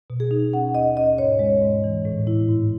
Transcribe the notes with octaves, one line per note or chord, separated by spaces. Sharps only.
B2
G#4
D#4
C#4 F#5
D#2 D#5
C#4 D#5
G#2 C#5
G#3
G#2
E3
A2
E4
G#2